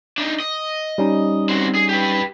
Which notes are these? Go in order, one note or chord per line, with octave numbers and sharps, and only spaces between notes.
D4 D#4
D#5
G3 C#4 D#4
C4 F#4
G#4
G4 B4